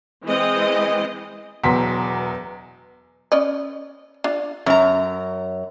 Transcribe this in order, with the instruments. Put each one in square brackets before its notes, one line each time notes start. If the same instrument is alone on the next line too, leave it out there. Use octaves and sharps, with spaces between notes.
[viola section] E3 G#3 C4 D#5
[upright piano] E1 E2 F#3 A#5 C6 B6
[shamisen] C#4 D5 D#5
D4 F4
[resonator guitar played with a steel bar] F#2 A#5 [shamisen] C#4